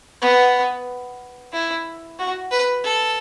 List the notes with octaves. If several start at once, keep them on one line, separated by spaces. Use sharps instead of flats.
B3
E4
F#4
B4
A4